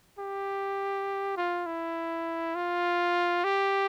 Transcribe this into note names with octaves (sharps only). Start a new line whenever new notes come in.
G4
F4
E4
F4
G4